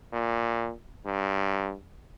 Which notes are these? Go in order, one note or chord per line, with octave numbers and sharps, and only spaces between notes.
A#2
G2